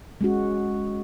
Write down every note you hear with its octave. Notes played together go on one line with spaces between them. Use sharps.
G#3 C#4 F#4